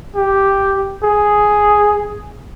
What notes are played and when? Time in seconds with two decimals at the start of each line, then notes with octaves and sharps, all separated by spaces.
0.16 G4
1.03 G#4